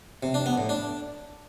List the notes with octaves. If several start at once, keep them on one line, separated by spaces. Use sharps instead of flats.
C3
D4
B3
A2
D4